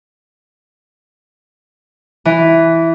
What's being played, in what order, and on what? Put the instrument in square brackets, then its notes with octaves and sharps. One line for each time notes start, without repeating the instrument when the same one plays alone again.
[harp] E3